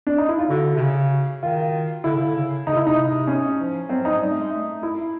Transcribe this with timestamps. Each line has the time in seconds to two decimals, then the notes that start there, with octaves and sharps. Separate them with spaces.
0.07 D4
0.18 D#4
0.29 E4
0.39 F4
0.50 D3 F#4
0.76 C3
0.81 C#3
1.43 D#3 F4
2.04 D3 E4
2.14 C#3
2.24 D3
2.36 C#3
2.67 D3 D#4
2.72 C3
2.76 C#3 E4
2.87 C3 D#4
3.27 C#4
3.59 F3
3.89 F#3 C4
4.00 F#3
4.05 D#4
4.21 G3
4.31 A3
4.41 G#3
4.52 A3
4.83 E4